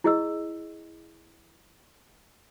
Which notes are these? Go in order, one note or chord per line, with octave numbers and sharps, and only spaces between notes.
E4 G#4 D#5 E6